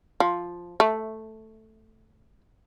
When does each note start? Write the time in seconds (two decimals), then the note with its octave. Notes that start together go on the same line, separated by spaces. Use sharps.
0.20 F3
0.80 A3